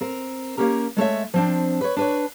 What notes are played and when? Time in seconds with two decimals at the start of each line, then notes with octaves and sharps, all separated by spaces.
0.01 C4 A#4
0.57 A#3 C#4 G4 A#4 A#5
0.97 G#3 A3 C#5 E5
1.34 F3 C4 D4
1.81 B4 C#5
1.97 D4 B4 C#5